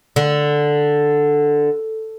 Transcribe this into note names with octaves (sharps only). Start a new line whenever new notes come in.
D3